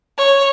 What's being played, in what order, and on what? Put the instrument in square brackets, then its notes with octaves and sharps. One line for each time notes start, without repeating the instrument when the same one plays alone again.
[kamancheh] C#5